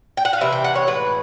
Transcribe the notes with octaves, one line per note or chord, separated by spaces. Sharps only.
G5
F#5
F5
C3 E3 E5
G5
F#5
C#5
A2 E3 G#3 B4